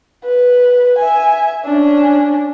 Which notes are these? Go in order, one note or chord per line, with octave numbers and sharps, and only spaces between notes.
B4
E5 G#5
C#4 D4